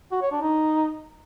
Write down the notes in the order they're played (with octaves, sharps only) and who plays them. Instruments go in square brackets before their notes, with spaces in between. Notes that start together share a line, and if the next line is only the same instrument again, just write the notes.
[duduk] F#4
C#5
D4
D#4